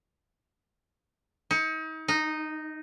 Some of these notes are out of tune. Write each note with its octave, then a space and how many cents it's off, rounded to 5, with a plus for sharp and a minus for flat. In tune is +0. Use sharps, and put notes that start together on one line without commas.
D#4 +35
D#4 -10